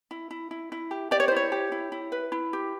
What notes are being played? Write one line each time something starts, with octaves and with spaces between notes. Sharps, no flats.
E4
E4
E4
E4
G4
G4 D5
C#5
C5
E4 C#5
G4
E4
E4
B4
E4
G4